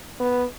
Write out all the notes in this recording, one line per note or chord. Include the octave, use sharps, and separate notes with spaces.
B3